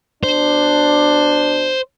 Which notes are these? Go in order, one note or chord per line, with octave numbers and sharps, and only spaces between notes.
B2 D4 C5